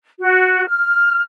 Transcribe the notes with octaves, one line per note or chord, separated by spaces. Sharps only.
F#4
F6